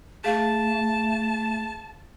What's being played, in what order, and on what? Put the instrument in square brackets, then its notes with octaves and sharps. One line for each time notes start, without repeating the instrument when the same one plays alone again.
[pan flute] A3 [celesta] G#4 F5 [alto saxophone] A5